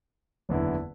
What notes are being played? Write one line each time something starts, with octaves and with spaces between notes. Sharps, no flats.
F#1 E2 D3 B3 E4